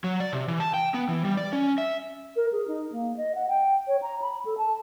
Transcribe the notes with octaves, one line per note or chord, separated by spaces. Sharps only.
F#3
D5
C3
E3
A5
G5
B3
E3
G3
D5
C#4
E5
A#4
G#4
D#4
A#3
D#5
F#5
G5
C#5
A#5
B5
A4
A5